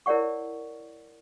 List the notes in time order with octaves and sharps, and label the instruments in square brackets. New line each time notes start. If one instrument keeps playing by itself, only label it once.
[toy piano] E4 A#4 C#5 D5 F#5 C#6